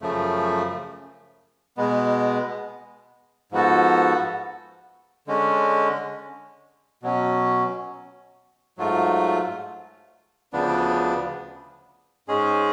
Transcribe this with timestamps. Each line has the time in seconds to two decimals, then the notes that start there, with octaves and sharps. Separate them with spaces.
0.01 F#2 C#3 F3 A3
1.77 B2 G#3 B3
3.52 G#2 F3 B3 F#4 A4
5.27 D3 G#3 C#4
7.03 B2 F#3 C#4
8.78 G#2 F#3 A3 F4
10.53 D2 C#3 F3 B3 D4
12.28 G#2 G#3 C#4 G#4